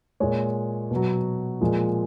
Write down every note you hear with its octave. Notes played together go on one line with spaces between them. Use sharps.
A#2 G#3 C#5
B2 F#3
A#2 F3 G#3